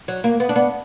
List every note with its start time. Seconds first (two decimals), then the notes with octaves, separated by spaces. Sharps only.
0.08 F#3
0.24 A#3
0.40 B3
0.49 D4
0.56 B3